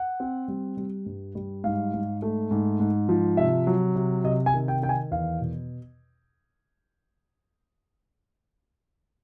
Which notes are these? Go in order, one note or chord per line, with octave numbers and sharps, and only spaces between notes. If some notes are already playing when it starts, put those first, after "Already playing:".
Already playing: F#5
C4
G3
G3
G2
G3
G#2 F5
G#2
A3
G#2
G#2
F3
C3 E5
F#3
C3
C3 D#5
G#5
D#3
G5
D#3 G5
G#5
E2 F5
B2